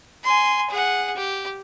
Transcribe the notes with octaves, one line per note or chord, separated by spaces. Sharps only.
G#5 C6
G#4 F#5
G4